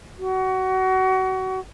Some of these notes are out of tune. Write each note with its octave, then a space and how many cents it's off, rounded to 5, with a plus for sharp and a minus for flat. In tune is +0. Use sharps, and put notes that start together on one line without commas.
F#4 +25